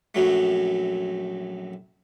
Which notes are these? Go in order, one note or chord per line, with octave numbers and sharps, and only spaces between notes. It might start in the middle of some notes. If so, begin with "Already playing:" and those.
A#1 F#2 F#3 A3